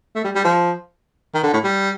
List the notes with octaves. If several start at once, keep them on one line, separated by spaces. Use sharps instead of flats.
A3
G3
G3
F3
D#3
D3
A2
G3